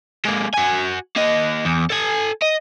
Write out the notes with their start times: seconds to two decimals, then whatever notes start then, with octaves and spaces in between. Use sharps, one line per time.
0.25 G#3 A#3
0.54 F#4 G#5
1.16 A#3 D#5
1.65 E2
1.90 A4 G#5
2.42 D#5